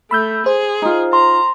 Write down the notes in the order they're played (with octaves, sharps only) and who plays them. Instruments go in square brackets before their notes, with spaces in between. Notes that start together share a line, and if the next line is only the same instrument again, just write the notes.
[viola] A3 [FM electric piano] B5 E6 G6
[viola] G#4 [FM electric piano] C5
[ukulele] D#4 F4
[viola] A#5 [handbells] C6